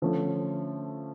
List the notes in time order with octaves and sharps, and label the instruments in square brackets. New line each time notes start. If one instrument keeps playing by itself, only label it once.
[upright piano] D3 F3 A3 C#4